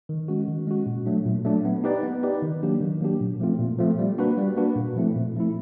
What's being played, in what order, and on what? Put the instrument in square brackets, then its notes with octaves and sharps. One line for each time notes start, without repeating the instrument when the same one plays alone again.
[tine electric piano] D#3
G#3 C#4 F#4
D#3
G#3 C#4 F#4
A#2
F#3 A3 D4
A#2
F#3 A3 D4
B3
D#4 G4 B4 D5
B3
D#4 G4 B4 D5
D#3
F#3 A#3 D4 G4
D#3
F#3 A#3 D4 G4
A#2
F3 A3 C4 F4
A#2
F3 A3 C4 F4
G3
A#3 D4 F#4 B4
G3
A#3 D4 F#4 B4
A#2
F3 A3 C4 E4
A#2
F3 A3 C4 E4